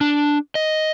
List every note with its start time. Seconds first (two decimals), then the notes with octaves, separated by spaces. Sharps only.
0.01 D4
0.55 D#5